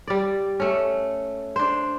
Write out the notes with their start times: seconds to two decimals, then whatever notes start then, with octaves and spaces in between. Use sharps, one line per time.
0.08 G3 D5
0.60 A3 C#4
1.56 D4 C5